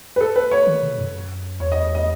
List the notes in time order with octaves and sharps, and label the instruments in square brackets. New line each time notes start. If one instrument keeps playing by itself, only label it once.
[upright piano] B4
A4
B4
C#5
[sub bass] D#3
B2
F#2
[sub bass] E2 [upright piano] C#5
[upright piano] D#5
D#5